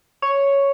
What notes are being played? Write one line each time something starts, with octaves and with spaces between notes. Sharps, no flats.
C#5